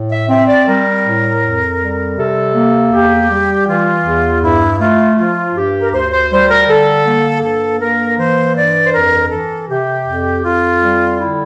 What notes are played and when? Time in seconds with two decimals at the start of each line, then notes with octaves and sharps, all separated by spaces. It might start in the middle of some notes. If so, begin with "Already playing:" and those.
Already playing: A2
0.10 E5
0.29 C4 E5
0.47 D5
0.66 G3 A#4
1.04 A2
1.42 F2
1.80 G3
2.17 C3 A4
2.55 A#3
2.92 E2 G4
3.30 G3
3.68 E3 F4
4.05 E2
4.42 G2 E4
4.79 A3 F4
5.17 F3 F4
5.55 G2 G4
5.81 A#4
5.92 D2 C5
6.11 C5
6.30 G3 C5
6.49 A#4
6.67 D3 A4
7.06 A#3
7.42 G2 A4
7.80 A#3 A#4
8.18 E3 C5
8.55 G2 D5
8.85 C5
8.93 F2 A#4
9.30 E3 A4
9.68 C3 G4
10.06 F2
10.43 F2 F4
10.81 G3
11.19 D3 E4